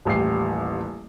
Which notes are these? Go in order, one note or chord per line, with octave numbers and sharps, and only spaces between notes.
D#1 A1 G4 C7